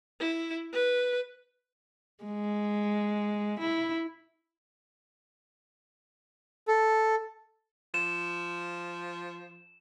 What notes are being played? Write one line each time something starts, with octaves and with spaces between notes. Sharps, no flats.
E4
B4
G#3
E4
A4
F3 E7